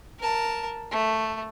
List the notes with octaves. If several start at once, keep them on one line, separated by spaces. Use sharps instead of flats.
A#4 A5
A3